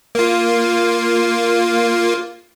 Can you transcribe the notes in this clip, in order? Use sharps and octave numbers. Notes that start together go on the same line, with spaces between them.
A#3 F4